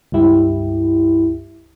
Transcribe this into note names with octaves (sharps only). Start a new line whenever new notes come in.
C#2 G2 E4 G4